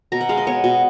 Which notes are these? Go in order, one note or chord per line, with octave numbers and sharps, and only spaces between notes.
B2 A#5
F#5
G#3 F5
D#5
B3 C#5
B2